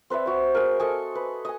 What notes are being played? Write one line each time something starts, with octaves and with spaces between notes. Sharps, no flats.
C4 B4 D5 E5
F#4 C5
G#4 A#4
A4 D#5 G#5
B4
D#5 G#5